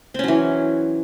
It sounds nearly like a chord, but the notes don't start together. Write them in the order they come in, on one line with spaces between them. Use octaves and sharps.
C4 C#4 F#3 E3